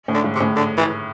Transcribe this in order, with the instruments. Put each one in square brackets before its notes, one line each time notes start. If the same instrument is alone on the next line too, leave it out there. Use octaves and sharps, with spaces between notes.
[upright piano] A2
[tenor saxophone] D3
[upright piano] G#2
[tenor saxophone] C3
[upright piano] A2
[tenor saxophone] D3
E3